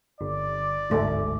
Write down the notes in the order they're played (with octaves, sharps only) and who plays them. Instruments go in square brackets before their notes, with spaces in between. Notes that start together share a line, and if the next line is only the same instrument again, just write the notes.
[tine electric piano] G1 [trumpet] D5
[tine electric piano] G1 D2 G#2 [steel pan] A3